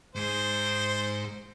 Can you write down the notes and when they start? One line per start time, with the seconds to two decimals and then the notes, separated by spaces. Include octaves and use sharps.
0.15 G#2 G#4 C5